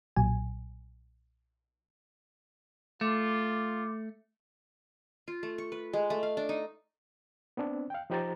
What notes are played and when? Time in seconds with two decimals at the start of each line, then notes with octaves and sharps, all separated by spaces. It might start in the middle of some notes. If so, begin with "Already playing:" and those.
0.16 B1 A#2 F#3 G#5
3.01 A3 F4 D6
5.28 F4
5.43 A3
5.58 C#6
5.72 B4
5.93 G#3
6.10 A3
6.23 F5
6.37 D4
6.49 D#4
7.57 B3 C4 D4
7.90 F5 G5
8.10 F3 D#4 G4 C5 A#5 A6